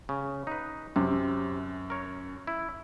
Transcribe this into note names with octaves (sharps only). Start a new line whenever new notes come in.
C#3
D#4 B4
F#2 C3
A#4 C#5
E4